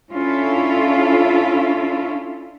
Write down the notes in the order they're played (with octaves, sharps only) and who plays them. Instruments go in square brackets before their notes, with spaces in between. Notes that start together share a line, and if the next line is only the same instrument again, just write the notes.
[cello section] C#4 D4 E4 F4 A4